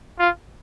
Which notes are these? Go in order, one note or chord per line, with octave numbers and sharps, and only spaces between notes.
F4